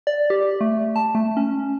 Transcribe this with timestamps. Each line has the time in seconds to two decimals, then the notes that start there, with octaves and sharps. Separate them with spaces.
0.07 D5
0.30 G4
0.61 A3
0.96 A5
1.15 A3
1.37 C#4